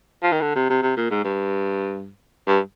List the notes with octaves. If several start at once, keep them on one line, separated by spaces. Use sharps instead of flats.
F3
D#3
D3
C3
C3
C3
A#2
G#2
G2
G2